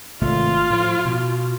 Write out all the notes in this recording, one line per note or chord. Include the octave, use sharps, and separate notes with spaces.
G#1 C3 A3 F4
A2 F3
B2